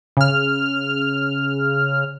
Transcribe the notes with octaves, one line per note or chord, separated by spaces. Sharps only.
C#3 F6